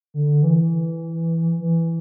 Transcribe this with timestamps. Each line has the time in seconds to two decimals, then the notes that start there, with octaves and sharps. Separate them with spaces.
0.14 D3
0.43 E3
1.60 E3